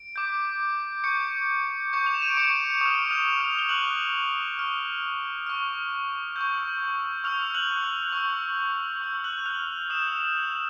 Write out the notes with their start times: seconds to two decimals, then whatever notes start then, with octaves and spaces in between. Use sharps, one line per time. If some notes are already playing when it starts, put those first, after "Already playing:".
Already playing: D7
0.16 D6 G6
1.04 C#6 D6 G6 C#7
1.93 C#6 D6 G6 C#7
2.06 F7
2.14 E7
2.22 D#7
2.29 D7
2.37 C#6 C#7
2.81 C#6 D#6 F6 D#7
3.11 F6 F7
3.40 F6 F7
3.59 G7
3.69 C#6 F6 F#6 F#7
4.59 C#6 F6
5.47 C#6 F6
6.36 C#6 E6 G6
7.24 C#6 E6 F6 G6 F7
7.55 F#6 F#7
7.83 F#6 F#7
8.12 C#6 E6 G6
9.02 C#6 E6 G6
9.24 F#6 F#7
9.46 F6 F7
9.90 D#6 E6 G6 E7